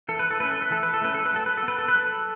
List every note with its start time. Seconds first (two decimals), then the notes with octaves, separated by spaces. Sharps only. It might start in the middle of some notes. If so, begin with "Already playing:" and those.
0.08 E3 A4
0.19 B4
0.31 A4
0.39 A3 C#4 B4
0.51 A4
0.62 B4
0.71 E3 A4
0.83 B4
0.94 A4
1.02 A3 C#4 B4
1.14 A4
1.26 B4
1.33 F#3 A4
1.46 B4
1.58 A4
1.63 B3
1.68 B4
1.79 A4
1.88 B4
1.94 F#3
2.00 A4